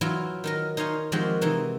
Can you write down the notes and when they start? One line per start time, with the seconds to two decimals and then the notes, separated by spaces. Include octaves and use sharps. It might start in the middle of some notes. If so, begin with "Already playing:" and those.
0.01 E3 F#3 E4 F4
0.44 D#3 D#4 A#4
0.77 D#4 C5 C#5 F5 G#5
1.12 D#3 F3 G#3 C4 F#4 G4
1.41 C3 E3 D#4